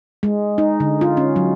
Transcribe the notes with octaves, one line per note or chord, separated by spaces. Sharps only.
G#3
D#4
D3
F4
C#4
F#3